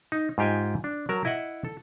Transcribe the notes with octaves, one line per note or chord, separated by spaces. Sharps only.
D#4
G#2 F4 G4 G5 G#5
D4
F#3 A#4 A5
E4 D#5 E5 F#5
A4